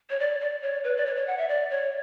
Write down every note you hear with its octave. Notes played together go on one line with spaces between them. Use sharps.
C#5
D5
D5
C#5
B4
D5
C#5
C#5
F#5
E5
D5
C#5